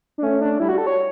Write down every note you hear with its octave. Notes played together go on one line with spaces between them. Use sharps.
D4
A3 C#4
D4
G3 E4
F#4
A4
C#5